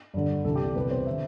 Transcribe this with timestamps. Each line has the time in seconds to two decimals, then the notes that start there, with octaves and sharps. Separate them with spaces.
0.14 G2 D3
0.44 C2 C3 E3 A4
0.56 G4
0.65 A4
0.76 C2 B2 B4
0.91 C5
1.07 D3 E5